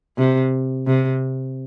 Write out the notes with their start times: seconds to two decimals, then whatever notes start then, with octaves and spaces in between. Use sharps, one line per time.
0.18 C3
0.87 C3